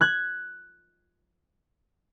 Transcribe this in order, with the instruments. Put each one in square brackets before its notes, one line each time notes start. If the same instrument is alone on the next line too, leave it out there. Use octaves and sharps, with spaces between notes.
[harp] F#6 G#6